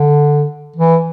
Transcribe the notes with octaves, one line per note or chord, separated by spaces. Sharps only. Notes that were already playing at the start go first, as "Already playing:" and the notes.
Already playing: D3
E3